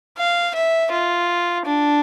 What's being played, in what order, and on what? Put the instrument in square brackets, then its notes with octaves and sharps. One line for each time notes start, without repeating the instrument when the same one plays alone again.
[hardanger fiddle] F5
E5
F4
D4